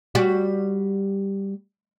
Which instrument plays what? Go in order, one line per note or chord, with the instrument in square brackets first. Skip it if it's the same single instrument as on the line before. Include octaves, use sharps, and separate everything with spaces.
[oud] G3 F#4